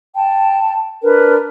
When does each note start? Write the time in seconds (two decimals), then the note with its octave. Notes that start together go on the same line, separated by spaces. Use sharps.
0.16 G5 A5
1.03 D4 A#4 B4